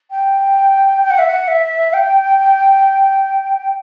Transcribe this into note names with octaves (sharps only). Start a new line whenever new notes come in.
G5
G5
F#5
E5
F#5
E5
G5